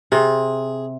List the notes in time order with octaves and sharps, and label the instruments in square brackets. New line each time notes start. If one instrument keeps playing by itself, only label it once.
[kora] C3 [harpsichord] G#4